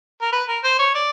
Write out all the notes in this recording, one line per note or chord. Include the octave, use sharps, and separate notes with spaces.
A#4
B4
A#4
C5
C#5
D5